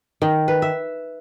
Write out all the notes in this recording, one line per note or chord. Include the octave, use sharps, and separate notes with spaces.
D#3
B4
E5